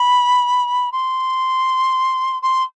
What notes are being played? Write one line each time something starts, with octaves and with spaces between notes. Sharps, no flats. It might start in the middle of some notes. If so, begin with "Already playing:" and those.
Already playing: B5
C6
C6